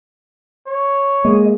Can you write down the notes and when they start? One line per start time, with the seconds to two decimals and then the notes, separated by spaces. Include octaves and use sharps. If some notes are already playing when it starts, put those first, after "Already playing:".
0.66 C#5
1.25 G#3 A#3 D#5